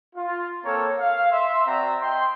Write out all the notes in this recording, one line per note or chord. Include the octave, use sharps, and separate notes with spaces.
F4
A#3 C4 A4 A#4 C#5
F5
E5 C6
C4 F#4 D5 E5 A#5
D#5 G5 C6